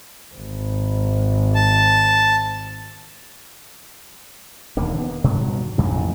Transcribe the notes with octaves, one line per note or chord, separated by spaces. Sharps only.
G#1
A5
E1 D#2 D3 A#3
B3
G2 B2 D#3 F#3
A1 F2 A#2